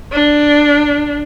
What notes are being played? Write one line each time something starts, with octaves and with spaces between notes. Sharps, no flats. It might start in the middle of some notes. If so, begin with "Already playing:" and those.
D4